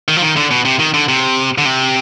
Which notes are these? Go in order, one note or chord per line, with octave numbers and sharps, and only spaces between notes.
D#3
F3
D#3
D3
B2
C3
D#3
D3
C3
D3
C3